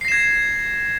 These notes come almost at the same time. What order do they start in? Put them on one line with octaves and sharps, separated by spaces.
C7 A#6 E7 G#6